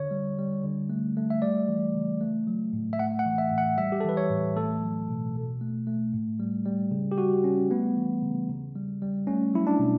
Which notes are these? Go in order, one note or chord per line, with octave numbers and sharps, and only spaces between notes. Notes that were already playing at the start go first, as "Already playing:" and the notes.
Already playing: D3 C#5
G3
G3
D3
A3
A3
E5
G3 D5
E3
C#3
A3
F#3
A2
E5
A3 F#5
F#5
E3
E5
A2
F#5
G3 E5
G4
A4
E3 B4
C#5
A2
A3 A4
F#3
B2
B2
A3
A3
A2
G3
G3
C#3
G4
G3 F#4
G3 C#4
A3 B3
E3
C#3
C#3
G3
G3
A3 C#4
F#3 E4
D4
B2